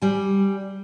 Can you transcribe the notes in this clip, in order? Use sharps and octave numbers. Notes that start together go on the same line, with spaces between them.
G3 G#5